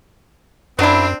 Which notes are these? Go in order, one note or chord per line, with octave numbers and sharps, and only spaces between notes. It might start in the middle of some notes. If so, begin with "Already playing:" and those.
F#2 F#3 C4 D4 E4